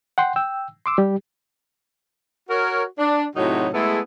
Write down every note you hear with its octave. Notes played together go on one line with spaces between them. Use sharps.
F#5 G5 C6
G5 E6
C6 D6 E6
G3 G4
F#4 A#4 C#5
D4
A2 C3 F#3 D#4 E4 F#4
G#3 A3 B3 E4 G#4 A4